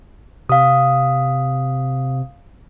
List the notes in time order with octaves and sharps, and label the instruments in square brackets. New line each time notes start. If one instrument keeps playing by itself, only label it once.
[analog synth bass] C3 [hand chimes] F5 D#6